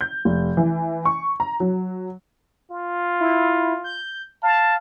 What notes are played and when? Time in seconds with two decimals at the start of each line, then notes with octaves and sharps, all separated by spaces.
0.01 G6
0.25 F1
0.57 E3
1.05 C#6
1.40 A#5
1.60 F#3
2.71 F4
3.20 E4
3.84 G6
4.43 F5 A5